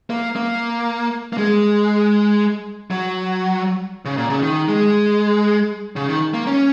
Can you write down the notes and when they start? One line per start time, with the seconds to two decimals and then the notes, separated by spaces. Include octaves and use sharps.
0.10 A#3
0.36 A#3
1.33 A#3
1.37 G#3
2.91 F#3
4.05 C#3
4.18 A#2
4.30 C#3
4.43 D#3
4.69 G#3
5.96 C#3
6.09 D#3
6.34 A#3
6.47 C#4